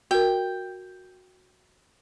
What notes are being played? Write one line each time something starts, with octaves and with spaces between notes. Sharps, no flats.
F#4 A#4 G5